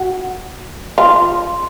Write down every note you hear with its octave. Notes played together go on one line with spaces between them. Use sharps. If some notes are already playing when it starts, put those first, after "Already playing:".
Already playing: F#4
F4